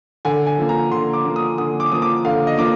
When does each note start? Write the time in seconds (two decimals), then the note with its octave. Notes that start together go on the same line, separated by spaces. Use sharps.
0.25 D3 G#5
0.46 G#5
0.58 F3 A#3
0.69 A#5
0.91 D3 C6
1.13 D6
1.25 F3 A#3
1.36 D#6
1.58 D3 D#6
1.80 D6
1.91 F3 A#3 D#6
2.02 D6
2.25 D3 F5
2.47 D#5
2.58 F3 A#3 D6